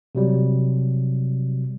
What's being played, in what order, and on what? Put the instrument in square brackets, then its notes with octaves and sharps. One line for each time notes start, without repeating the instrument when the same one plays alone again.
[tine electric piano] C3 F#3 G3